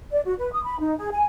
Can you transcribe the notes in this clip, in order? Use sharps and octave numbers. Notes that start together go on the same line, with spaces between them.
D5
F#4
B4
D#6
B5
D#4
G#4
G#5